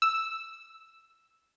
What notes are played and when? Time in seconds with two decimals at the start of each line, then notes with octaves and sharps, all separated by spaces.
0.02 E6